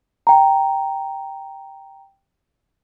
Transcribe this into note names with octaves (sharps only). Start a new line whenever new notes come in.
G5 A#5